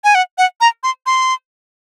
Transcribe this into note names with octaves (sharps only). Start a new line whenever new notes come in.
G#5
F#5
F#5
A#5
C6
C6